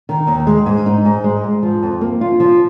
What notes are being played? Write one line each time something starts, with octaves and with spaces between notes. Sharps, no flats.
D#3
D#2
G#3
G#2
D#4
G#2
G#3
G#2
F3
F2
A#3
F4
F3